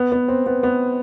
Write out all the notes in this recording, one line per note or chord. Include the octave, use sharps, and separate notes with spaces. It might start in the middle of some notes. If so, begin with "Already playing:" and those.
Already playing: B3
B3
C4
B3
B3